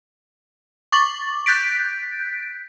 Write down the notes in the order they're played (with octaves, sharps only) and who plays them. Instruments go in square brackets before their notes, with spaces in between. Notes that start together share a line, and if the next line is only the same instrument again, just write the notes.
[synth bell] C#6 D6 A6 F#7
F#6 G6 A6 B6 D7